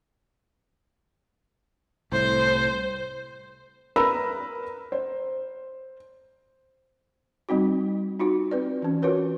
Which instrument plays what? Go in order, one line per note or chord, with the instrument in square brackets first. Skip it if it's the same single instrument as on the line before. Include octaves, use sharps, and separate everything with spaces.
[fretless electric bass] C2 A2 [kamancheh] C5
[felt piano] A#4 B4 A#5 B5 E6
C5
[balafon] G3 C4 D#4 F#4
D#4 F4 F#4
C4 B4 D5
E3 C#4
F4 F#4 A#4 B4 C#5